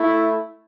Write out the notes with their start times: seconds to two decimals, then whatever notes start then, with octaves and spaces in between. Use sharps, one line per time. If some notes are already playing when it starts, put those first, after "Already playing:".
Already playing: A3 E4